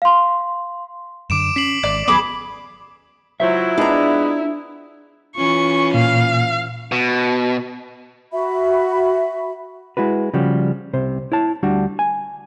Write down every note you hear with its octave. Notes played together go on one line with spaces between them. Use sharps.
F5 C6
F#2 D3 D6 D7 E7
C#4 B6 C7 F#7
G#1 D5
D#2 F#3 B3 G#4 B5 D6 F#7
F#3 E4 F4 C5 E5
G#3 B3 D4 A#5
E3 C#4 F4 C#6
A#2 F5
B2
F#4 E5 B5
G#3 E4 F#4 B4
C#3 F3 G3 F#4 G4
C2 C3 C5
E4 C#5 A5
D2 G3 D4 F#4
G#5